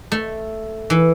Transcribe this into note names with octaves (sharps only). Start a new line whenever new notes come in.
A3
E3